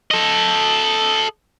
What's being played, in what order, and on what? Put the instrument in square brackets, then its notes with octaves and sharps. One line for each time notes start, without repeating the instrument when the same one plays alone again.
[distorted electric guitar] A4 D#5